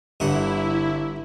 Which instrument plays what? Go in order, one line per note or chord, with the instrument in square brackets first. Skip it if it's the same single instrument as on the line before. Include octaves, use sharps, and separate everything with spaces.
[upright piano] G1 [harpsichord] G2 D3 F#5 [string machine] E4